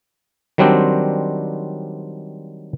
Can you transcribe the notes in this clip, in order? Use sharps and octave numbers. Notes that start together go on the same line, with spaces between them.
D#3 F#3 G3 C4 D4 C5